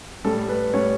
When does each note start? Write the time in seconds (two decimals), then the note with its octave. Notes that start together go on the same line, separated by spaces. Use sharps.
0.24 A2 G3 A4
0.49 B4
0.74 A2 G3 C#5